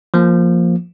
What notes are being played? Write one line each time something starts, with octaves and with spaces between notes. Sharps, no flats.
F3 A#3